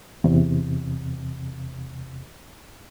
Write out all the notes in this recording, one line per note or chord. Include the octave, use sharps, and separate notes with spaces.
E2 C3